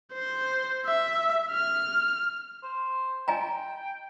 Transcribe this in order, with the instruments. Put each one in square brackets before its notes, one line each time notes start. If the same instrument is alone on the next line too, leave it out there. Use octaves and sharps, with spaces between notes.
[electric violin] C5
E5
F6
[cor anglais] C5
[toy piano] D#5 G#5 A#5 [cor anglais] G5